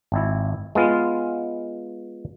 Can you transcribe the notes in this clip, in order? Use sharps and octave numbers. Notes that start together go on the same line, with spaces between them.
G#1 E4
G#3 B3 F4